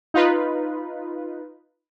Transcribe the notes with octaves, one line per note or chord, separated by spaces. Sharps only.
D#4 F4 B4